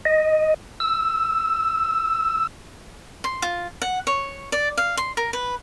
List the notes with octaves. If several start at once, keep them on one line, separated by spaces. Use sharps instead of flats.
D#5
E6
C6
F4
F#5
C#5
D5
F5
C6
A#4
B4